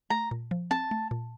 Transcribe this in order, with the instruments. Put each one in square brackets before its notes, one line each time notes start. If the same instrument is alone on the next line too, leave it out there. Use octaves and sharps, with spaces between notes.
[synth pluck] A3 [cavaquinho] A#5
[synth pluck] A#2
F3
[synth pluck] C4 [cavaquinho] A5
[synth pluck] A3
A#2